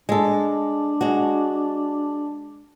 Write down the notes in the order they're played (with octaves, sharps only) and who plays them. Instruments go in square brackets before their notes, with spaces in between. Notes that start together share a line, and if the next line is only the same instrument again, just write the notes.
[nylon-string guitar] G#3 A4 [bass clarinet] D4
[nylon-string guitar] G#3 F#4